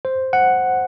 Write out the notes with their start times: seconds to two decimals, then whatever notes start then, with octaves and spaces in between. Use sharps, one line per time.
0.05 C5
0.33 F#5